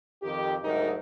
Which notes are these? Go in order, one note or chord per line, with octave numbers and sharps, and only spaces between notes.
F2 D#3 G4
D2 G#2 F#3 D#4 A#4